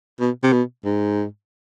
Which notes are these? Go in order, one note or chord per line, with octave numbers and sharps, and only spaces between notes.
B2
C3
B2
G#2